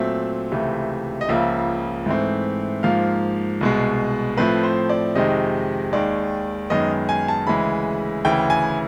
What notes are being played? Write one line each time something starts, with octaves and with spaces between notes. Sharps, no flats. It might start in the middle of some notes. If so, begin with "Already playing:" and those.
Already playing: A#2 F#3 A3 C4 E5
C#2 C3 E3 A3
D#5
C#2 C#3 F3 A#3 E5
G#2 E3 A3 C4
G#2 F3 A#3 F5
C2 B2 G#3
A2 F3 A3 C4 B4
C5
D5
F2 C3 D#3 G#3 D#5
D#2 D#3 G#3 D5
F#2 D#3 G#3 B3 D#5
G#5
A5
D2 C#3 E3 G#3 B5
D2 C#3 E3 G5
G#5